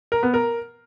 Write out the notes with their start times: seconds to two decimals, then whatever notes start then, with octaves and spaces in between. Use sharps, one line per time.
0.12 A#4
0.23 B3
0.34 A#4